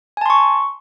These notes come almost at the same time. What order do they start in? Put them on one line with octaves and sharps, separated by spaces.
G#5 A5 C6 C#6